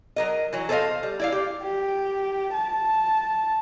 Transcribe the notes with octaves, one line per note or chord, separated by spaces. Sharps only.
F#3 A#4 D#5
E3 F#3
A4 B4 C5 D5 D#5 F5
G3
E4 D5 F5
G4
G4
A5